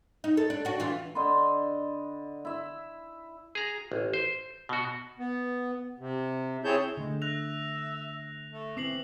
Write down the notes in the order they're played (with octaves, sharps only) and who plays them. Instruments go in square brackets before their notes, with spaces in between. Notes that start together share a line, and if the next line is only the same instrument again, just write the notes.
[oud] D#4
A4
D4
D4 F#4
E3 D4 F4
[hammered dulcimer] D3 D#5 B5 C6
E4 E5
[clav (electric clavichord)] G#4 A#5
A1
C5
B2 F#4
[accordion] B3
C3
C4 E4 G#4 C#5 A5 G6
[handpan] D3 A3 [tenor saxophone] G#3
[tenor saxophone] E5 [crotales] F#6 A#6 F7
[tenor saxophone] A3
[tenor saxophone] E3 [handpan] C4 [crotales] D6 C7 F#7